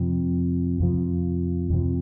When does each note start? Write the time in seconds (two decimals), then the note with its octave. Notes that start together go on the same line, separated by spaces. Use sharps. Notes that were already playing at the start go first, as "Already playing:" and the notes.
Already playing: F2 C3 F3
0.80 F2 C3 F3
1.70 F2 C3 F3